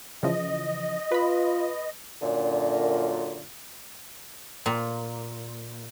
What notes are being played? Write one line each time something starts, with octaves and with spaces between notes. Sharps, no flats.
C#3 E3 F3 D#5
F4 B4 B5
F#2 A#2 D3
A#2